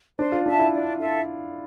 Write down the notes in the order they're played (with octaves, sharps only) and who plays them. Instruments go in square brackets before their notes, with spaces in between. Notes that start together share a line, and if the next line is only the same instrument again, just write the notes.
[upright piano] D4 [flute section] C5
[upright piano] F4
[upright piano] D4 [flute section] E5 A5
[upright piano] E4
[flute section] D4
F4 A4 E5